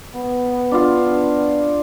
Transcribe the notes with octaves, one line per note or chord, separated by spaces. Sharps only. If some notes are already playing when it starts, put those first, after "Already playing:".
B3
D4 F4 F5